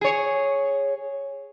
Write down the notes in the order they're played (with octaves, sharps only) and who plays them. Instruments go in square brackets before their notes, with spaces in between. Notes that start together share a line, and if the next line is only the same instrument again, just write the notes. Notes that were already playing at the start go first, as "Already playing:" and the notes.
[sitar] G#4 C#5